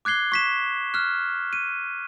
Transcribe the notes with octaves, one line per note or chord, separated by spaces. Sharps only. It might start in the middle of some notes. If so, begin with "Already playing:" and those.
D6 F#6 G#6 C7 G7
C#6 B6 E7
F6 F#6
D#7